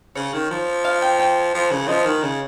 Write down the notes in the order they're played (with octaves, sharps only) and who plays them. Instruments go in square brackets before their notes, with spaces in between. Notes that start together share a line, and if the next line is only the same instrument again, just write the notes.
[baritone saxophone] C#3 [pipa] C#5
[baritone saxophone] D#3
F3
[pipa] F5
G5
G5
[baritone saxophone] F3
C#3
[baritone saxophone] F3 [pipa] D#5
[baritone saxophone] D#3
C#3